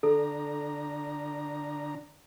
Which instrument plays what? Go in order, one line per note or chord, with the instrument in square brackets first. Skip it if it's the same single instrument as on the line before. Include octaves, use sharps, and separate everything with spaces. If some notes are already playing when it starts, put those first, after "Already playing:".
[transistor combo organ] D3 D4 A#5 [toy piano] A4